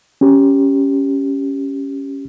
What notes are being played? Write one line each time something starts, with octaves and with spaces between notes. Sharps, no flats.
C#4 G4